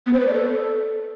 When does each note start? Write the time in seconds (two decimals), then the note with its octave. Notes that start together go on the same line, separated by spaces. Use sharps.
0.06 B3
0.13 C5
0.20 B4
0.27 D5
0.34 A4